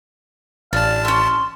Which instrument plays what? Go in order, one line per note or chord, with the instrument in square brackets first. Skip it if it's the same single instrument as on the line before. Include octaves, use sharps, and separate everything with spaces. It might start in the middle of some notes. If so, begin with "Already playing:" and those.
[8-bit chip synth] A1 A5 [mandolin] D4 [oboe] F5
[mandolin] A3 C#4 [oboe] C6